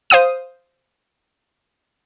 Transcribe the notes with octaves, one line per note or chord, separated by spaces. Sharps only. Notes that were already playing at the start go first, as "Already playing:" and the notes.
C5 F5 D#6 D#7